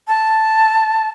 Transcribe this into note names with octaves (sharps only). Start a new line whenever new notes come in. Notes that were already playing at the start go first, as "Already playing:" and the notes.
A5